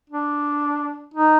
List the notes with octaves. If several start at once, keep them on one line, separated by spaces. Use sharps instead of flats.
D4
D#4